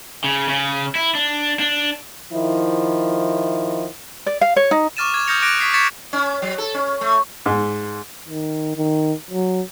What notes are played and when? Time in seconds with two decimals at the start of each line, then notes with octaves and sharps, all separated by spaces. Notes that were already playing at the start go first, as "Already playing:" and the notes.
0.24 C#3
0.48 C#3
0.95 E4
1.15 D4
1.60 D4
2.31 D#3 F3 E4
4.26 D5
4.41 F5
4.56 C#5
4.71 D#4
4.97 C#6 D6 F6 A6 D#7 E7
5.13 D6 G#6
5.27 D#6 F6 G6 A#6 C#7 F7
5.42 D6 F#6 A#6 D7 F7
5.60 C#6 G#6 B6 C7
5.73 C#6 G#6 A6 B6 C#7 E7
6.13 C#4
6.42 F#3
6.58 A4
6.74 C#4
7.01 A3
7.46 G#2
8.29 D#3
8.76 D#3
9.30 F#3